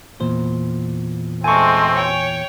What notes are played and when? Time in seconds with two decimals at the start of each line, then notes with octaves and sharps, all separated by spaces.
0.20 E2 A#2 C5
1.44 A1 G#3 A3 C4 G#5 A5 C#6
1.92 C#5 G5